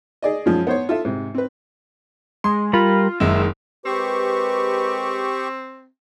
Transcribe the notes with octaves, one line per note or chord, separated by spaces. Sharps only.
G#4 D5 D#5
F#2 F3 G#3
B3 C5 C#5
F4 A4 E5
G#2 C3
C4 B4
G#3 C6
G3 F4 A#4 B5
F#1 D#3 G#3 E5
G#3 C4 G4 A#4 B4 C#6